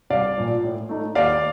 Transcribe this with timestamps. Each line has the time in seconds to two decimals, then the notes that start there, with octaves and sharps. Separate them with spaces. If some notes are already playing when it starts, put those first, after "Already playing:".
0.10 C2 D5 F5
0.38 A#2 F3
0.64 A2
0.89 A3 D#4
1.15 D#2 D5 F5